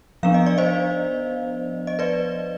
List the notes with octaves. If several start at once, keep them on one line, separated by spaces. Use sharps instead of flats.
F3 B3 D4 F5
D#5
D5
C5 D#5
D#5
B4 D5